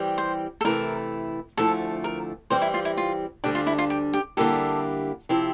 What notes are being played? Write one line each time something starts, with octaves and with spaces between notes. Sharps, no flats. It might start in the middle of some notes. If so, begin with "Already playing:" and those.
Already playing: E3 G3 C4 G4
C5
A4
C3 E3 A3 E4 A#4
D2 D3 F3 A3 E4 A4
A#4
E3 G3 C4 G4 C5
E4
F4
E4
F4
D2 D3 G3 D4 G4
F4
E4
F4
G4
G4
D3 G3 A#3 E4 G4 A4
C3 F3 C4 E4 G4